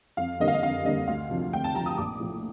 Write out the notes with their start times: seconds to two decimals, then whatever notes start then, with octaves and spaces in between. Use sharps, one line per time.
0.17 F2 F5
0.40 D3 G3 A#3 D#5
0.48 F5
0.54 D#5
0.63 F2 F5
0.85 D3 G3 A#3 D#5
1.07 D2 F5
1.30 C3 F3
1.53 D2 G5
1.64 A5
1.75 C3 F3 A#5
1.86 D#6
1.98 A#1 D6
2.20 A2 F3